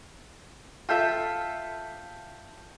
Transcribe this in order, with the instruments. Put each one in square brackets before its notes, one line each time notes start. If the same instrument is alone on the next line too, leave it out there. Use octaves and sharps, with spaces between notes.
[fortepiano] F4 A4 E5 [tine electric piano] G5 G6